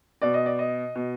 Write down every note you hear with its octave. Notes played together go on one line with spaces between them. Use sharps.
B2 D5
D#5
D5
D#5
B2